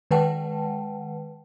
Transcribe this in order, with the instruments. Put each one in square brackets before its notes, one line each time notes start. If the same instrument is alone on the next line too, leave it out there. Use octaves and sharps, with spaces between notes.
[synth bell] D#3 G#3 B4 F#5 G5 A5